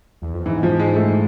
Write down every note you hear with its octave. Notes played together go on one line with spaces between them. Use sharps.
E2
F2
G#2 E3
F3
G#3
A3